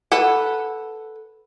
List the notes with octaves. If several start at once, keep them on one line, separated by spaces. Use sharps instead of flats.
A4 B4 F#5